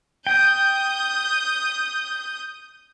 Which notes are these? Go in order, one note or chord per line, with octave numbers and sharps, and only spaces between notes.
G5 D#6 G6